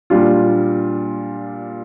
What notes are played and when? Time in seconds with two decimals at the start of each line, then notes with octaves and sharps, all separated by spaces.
0.10 A#2 G3 D4 F4